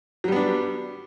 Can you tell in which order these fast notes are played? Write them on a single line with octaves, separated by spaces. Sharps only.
F#3 G3 B3 D4